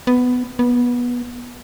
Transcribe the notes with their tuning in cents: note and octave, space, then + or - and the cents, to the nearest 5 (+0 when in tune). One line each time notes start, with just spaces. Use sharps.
B3 +10
B3 -20